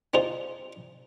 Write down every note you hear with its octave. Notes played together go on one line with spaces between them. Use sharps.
C4 D4 D#4 F4 G#4